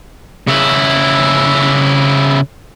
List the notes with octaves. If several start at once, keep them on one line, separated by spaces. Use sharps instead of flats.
C#3 E4